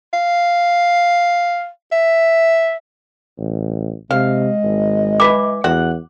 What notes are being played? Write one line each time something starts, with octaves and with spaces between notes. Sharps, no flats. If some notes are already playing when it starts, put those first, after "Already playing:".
F5
E5
A1
C3 G#3 F5
G#1
E3 B4 D6
E2 F#4 F#5